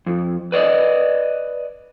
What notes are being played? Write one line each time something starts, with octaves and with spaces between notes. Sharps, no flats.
F2
B4 D5 D#5